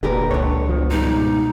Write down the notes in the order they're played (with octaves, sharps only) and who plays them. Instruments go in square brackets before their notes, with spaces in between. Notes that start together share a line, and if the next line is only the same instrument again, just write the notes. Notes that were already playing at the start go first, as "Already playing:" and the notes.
[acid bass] F1 [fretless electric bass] A#2 D3 [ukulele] G4 A#4 B4
[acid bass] C#2 [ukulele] D4 C#5
[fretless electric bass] F3 B3
[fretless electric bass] G#2 B2 G3 [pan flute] D#4